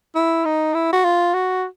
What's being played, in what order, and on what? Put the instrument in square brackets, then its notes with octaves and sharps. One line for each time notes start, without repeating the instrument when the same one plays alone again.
[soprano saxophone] E4
D#4
E4
F#4
F4
F#4